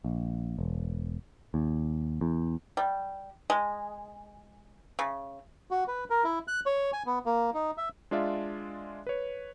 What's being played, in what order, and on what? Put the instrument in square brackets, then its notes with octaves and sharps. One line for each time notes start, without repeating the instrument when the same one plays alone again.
[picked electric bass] A#1
E1
D#2
E2
[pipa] G3
G#3
C#3
[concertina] F#4
B4
A#4
E4
F#6
C#5
G#5
B3
A#3
D#4
E5
[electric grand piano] G#3 D4 F4 D5 E5 F5
B4 C#5